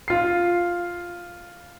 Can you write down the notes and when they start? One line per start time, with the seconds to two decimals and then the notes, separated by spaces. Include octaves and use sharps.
0.08 F4 C7